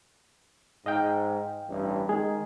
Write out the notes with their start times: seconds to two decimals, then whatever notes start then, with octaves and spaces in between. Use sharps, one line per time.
0.86 G#2 D#5 F5 G5
1.68 A1 G2
2.09 D#3 G#3 G#4